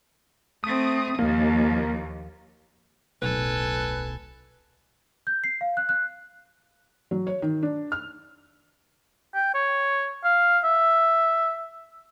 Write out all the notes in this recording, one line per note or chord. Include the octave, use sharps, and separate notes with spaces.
A3 C4 D#6
D#2 F3 A#3
D1 B1 A4 B4 G#5
G6
C7
F5
F#6
F#6
F#3
C#5
D#3
D4
F6
G5
C#5
F5
E5